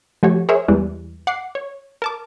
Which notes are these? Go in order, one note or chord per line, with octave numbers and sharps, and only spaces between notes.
F3 A3 F#4 G4 C#5
G#4 A#4 C5 C#5 E5
E2 E3 G3 G#3
F#5 D6 C7
C#5
A#4 A5 D6